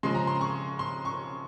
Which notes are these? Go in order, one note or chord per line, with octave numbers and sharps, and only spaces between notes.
C#3 F3 G#3 C6
A#5
C6
C#6
C6
C#6